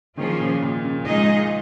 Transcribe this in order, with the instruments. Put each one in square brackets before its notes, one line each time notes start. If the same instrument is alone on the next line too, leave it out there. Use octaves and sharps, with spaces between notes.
[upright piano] D#3 [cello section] F3 A#3 C#4 F4 G#4
[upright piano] A#2
A#2
C#3
[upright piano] F3 [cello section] G#3 D#4 G#4 D#5